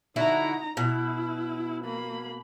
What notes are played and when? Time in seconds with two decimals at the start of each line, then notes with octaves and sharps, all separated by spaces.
0.16 D3 D#4 E4 F#4 A#5
0.77 B2 E4
1.85 A#3 B5